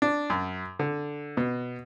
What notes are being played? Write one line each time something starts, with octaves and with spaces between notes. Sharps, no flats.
D4
F#2
D3
B2